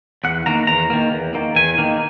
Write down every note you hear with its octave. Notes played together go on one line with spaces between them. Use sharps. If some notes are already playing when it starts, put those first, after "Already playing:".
E2 F#5
D#3 A#3 A#5
E2 A#5
D#3 A#3
E2
D#3 A#3
E2 G#5
D#3 A#3